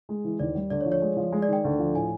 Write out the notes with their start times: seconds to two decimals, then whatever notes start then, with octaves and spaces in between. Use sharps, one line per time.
0.09 G#3
0.24 E3
0.39 D#2 D5
0.55 G3
0.71 D2 D5
0.81 C#5
0.86 F3
0.92 C#5
1.02 G#3
1.17 F3
1.32 G#3
1.42 D5
1.48 D#3 G5
1.64 D2
1.79 F3
1.94 A2 G#5